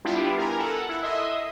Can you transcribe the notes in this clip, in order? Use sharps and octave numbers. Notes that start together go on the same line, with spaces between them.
G3 B3 D4 E4 F4 G4
A#4 G#5 A#5
A4 F#5
E4
D#5 E5 C6 D#6